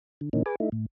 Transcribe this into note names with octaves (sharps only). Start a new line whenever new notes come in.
D3
A#2 D3 E3 A#3 C#4 D#4
G#4 B4 G#5 D6
A3 D#4 E4
A2